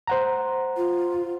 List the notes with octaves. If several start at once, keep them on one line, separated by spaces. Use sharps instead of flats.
C5 F#5 A#5
F4